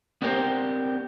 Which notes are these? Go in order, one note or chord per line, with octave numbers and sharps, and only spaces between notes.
B3 C4 D4 G4 A#4 C5